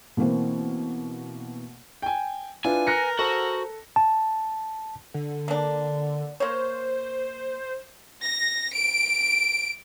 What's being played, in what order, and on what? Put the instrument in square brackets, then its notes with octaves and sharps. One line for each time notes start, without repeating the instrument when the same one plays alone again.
[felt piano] B2 E3 A#3 C4
[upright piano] G5 G#5
[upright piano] D4 E4 F4 [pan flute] B4 [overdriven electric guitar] G#5
[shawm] A#4 [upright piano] F#6 A#6 C#7
[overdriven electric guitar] F#4 [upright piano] A4 [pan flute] C5
[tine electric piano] A5
[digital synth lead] D3
[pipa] A#3 D4
[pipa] A#3 C#5 [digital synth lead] C5
[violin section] A#6
D7